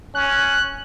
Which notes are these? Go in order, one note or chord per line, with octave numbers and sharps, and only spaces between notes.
C#4 F#6